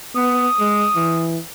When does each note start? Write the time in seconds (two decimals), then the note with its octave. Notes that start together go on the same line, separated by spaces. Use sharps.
0.16 B3 D#6
0.59 G#3
0.96 E3